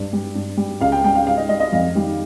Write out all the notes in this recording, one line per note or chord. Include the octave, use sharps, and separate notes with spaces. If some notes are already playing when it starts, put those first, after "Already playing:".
Already playing: G2
G3
G2
G3
C#2 F5
G5
C#3 G3 G5
F5
G#2 F5
D#5
G3 D#5
D#5
F2 F5
D#3 G3